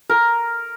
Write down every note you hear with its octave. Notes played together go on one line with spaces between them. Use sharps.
A#4